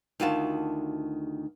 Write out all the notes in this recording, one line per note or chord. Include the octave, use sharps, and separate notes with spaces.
D2 D#3 F4 F#4 B4 A5